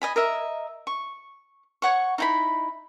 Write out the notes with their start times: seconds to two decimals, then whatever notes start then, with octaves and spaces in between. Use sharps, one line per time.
0.02 D#5 G#5 B5
0.16 A#4 D#5 E5
0.87 C#6
1.82 C#5 F#5 C#6
2.18 D#4 E4 B5